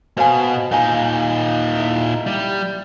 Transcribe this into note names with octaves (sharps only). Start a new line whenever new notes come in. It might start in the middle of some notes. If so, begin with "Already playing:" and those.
B2 C5 F5 G#5
A#2 D#4 F5 G#5
E4 E5
G3